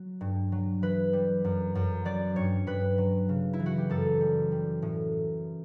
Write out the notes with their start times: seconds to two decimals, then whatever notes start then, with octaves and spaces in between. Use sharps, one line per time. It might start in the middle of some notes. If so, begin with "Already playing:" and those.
Already playing: F#3
0.21 G2
0.52 F#3
0.82 E3 B4
1.13 G3
1.44 F#2
1.75 F#2
2.05 F#3 D5
2.36 G2 C#5
2.67 G2 B4
2.98 F#3
3.29 C#3
3.53 E4
3.60 E3
3.66 F#4
3.78 G4
3.89 F#2 A4
4.21 G3
4.52 G3
4.82 A2